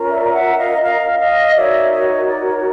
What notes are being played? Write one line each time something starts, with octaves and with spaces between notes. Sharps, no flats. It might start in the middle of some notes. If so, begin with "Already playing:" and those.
Already playing: C#4 F4 A#4
D5 E5
E5 F#5
D#5 F5
E5
D#5 F5
D#5 F5
D#4 F#4 A#4 C#5 D5 E5
C#5 D#5
D5
C#5